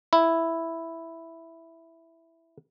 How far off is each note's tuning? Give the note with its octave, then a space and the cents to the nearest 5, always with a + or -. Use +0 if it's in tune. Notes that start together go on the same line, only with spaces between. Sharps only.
E4 +0